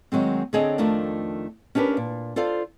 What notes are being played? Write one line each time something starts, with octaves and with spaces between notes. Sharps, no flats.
D#3 F#3 G#3 C4
D3 C4 G#4 C#5 D#5
F2 D#3 A3 D4 F4 A#4
C#4 D4 G4 A#4 B4
A#2
F4 A4 C5 D5 F5